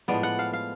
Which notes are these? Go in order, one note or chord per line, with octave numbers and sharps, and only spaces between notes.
A2 F3 G#3 B3 D5
F#5
F5
F5